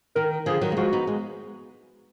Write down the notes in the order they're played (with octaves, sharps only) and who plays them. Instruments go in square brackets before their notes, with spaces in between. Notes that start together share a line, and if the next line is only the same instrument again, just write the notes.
[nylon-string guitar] D#3 [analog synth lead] A#4
[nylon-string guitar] D3 F3 [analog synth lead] G#4
[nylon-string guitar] D#3 F#3
A#3
[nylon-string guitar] F3 G#3 [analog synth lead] F#4
[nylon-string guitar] B3 D#4
G#3